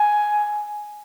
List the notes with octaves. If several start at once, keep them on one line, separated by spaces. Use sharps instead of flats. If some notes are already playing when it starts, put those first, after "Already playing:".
Already playing: G#5